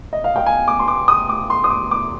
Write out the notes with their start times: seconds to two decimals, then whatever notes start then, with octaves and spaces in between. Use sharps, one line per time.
0.13 D#5
0.24 F5
0.36 G5
0.46 G#5
0.68 D6
0.80 C6
0.88 D6
1.08 D#6
1.29 D6
1.50 C6
1.64 D#6
1.71 D6
1.91 D6